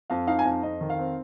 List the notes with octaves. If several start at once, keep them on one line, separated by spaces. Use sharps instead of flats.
F2 F5
D#4 F5
G#5
F2 F5
F2 D#5
D#3
F5
C4